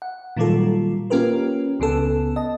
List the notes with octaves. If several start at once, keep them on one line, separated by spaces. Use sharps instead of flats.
F#5
A#2 D#3 F#3 G3 F4 A4
A#3 C#4 F4 G4 A#4 B4
C#2 C#3 B3 A4
D#5 A5